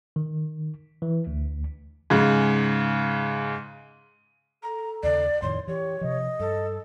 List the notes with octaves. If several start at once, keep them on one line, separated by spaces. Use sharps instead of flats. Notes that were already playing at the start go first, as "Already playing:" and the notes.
D#3
E3
D2
G#2 C#3
A4 A#5
D#2 C#3 D5
F2 A2 D#3 C#5 C6
E3 G4 C#5
C3 F3 D#5
G2 A4